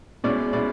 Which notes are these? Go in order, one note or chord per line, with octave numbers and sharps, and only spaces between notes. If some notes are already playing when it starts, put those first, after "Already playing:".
B2 G#3 C#4 E4 D5
B2 G#3 C#4 E4 D5